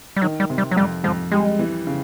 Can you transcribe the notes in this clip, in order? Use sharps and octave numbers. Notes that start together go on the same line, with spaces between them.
G3
D#3 F#3
G3
C3
G3
F#3
F2 G3
F2 F3
G3 G#3
E3
C#3